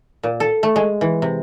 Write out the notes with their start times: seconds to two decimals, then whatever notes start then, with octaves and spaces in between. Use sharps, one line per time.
0.23 A#2
0.40 A4
0.63 A3
0.76 G#3
1.01 E3
1.22 C3